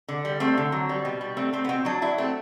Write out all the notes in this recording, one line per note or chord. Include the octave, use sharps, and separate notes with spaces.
D3
G3
A3 C4
D3
F#3
G3
B2
G3
A3 C4
A3 C4
B3
B2 C4
F#3 D4
F#3 E4
A3 C4